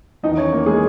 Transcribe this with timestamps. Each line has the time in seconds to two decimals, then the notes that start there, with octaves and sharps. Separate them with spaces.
0.23 E2 D#3 F#3 D#4 D#5
0.37 C#4 C#5
0.52 A#3 A#4
0.66 G#3 G#4